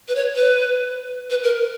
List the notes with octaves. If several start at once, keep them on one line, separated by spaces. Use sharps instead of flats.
B4
C#5
B4
B4
A#4